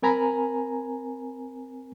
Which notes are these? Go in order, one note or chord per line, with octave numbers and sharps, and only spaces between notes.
C4 A#4 G#5 A#5 B5